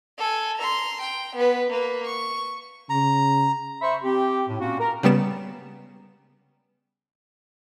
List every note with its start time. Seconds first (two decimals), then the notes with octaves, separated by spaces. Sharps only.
0.18 A4 G#5
0.58 A#5 C6
1.01 G5
1.36 B3 B4
1.70 A#3 B4
2.06 C#6
2.90 C#3 A#5
3.82 C5 E5 B5 C#6
4.03 C4 G4
4.48 A2
4.61 A#2 A#3 C4 C#4 F#4
4.80 A#4
5.03 C#3 G3 B3 E7